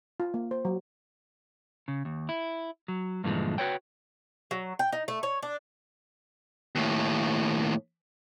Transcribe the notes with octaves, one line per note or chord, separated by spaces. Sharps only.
F4
A#3
C5
F#3
C#3
D#2
E4
F#3
G2 A#2 D3 E3 F3 G#3
F#4 B4 C#5 G5
F#3
G5
D#4
A3
C#5
D4
D#2 A2